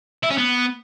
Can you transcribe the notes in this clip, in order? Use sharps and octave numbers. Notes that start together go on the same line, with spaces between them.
E4
C#4
B3